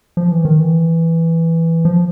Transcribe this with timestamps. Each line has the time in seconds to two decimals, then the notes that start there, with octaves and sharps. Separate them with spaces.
0.17 F3
0.31 E3
0.45 D#3
0.60 E3
1.85 F3